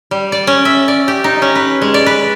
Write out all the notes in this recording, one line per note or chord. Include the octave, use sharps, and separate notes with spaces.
G3
D5
C#4
E5
D5
G4
D#4
C#4
B4
G#3
D5
B4